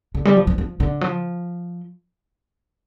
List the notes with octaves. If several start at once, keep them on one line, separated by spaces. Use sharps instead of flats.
D3
G3
F3
F3
F3
D3
F3